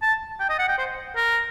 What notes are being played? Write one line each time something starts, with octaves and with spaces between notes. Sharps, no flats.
A5
G5
D#5
F#5
G5
C5
A#4